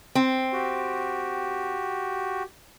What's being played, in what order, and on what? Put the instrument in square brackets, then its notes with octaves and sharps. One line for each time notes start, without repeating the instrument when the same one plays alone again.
[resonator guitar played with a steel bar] C4
[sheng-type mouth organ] F#4 G4